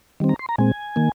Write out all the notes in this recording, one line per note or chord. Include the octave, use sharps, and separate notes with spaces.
D#3 G3 C4
A#5
C6
A#5
A#2 G#3 C4 G#5
D#3 A#3